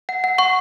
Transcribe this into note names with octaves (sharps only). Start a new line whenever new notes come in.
F#5
F#5
F#5 C#6